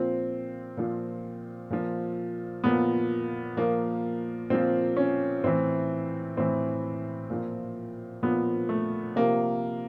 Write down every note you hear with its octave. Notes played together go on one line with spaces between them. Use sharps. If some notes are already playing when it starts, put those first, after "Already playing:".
Already playing: A#2 F3 C4
A#2 F3
A#2 F3
A#2 F3 B3
A#2 F3 A#3
A#2 F3 C4
C#4
A2 E3 C4
A2 E3 C4
A#2 F3
A#2 F3 B3
A3
C3 F3 A#3